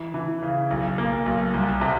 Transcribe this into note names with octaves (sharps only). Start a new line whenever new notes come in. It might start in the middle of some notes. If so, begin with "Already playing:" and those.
Already playing: E3
E3
C#3
B1
A#3
B1
C2
C3